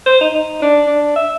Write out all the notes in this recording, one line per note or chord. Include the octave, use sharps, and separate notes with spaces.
C5
D#4
D#4
D4
D4
E5